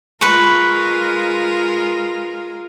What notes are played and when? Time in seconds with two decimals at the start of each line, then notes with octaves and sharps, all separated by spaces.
0.21 G#3 F4 A#4 B4 C#6